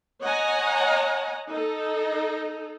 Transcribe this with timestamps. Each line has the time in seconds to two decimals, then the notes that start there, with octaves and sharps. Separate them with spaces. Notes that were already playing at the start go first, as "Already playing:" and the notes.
0.22 C#5 D#5 F#5 G#5 A#5
1.48 D#4 A4